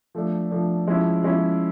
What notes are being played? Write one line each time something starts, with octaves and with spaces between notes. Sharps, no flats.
F3 A3 D4
F3 A3 D4
F3 G#3 C#4 E4
F3 G#3 C#4 E4